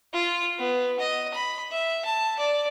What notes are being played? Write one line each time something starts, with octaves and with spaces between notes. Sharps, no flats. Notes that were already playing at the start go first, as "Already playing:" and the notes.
F4
B3
D#5
B5
E5
A5
D5